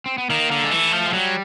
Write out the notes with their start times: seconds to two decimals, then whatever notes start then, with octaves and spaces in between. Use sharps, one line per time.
0.06 C4
0.18 B3
0.30 D#3 A#3
0.51 D3
0.64 G#3
0.71 E3 A3
0.92 F3
1.06 G#3
1.13 F#3 G3